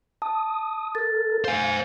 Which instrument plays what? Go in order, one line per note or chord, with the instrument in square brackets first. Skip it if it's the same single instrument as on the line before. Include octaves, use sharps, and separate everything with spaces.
[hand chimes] A5 [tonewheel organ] D#6
[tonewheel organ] A4 A#4 [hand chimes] A6
[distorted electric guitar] C5 G#5 [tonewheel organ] F5